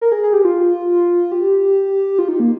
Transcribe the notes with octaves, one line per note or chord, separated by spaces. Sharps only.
A#4
G#4
G#4
G4
F4
G4
F4
D#4
A#3